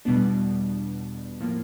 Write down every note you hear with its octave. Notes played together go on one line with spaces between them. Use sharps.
E2 B2 G3 B3 D4
A2 F3 A#3